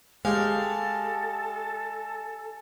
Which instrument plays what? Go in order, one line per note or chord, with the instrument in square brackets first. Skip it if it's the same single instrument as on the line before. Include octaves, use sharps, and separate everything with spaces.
[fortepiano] G#3 G4 [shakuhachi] A4 [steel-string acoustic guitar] F5 G5 [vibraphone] G#5